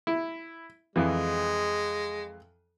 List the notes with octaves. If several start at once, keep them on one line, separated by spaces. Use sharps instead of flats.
E4
F2 E3 G#3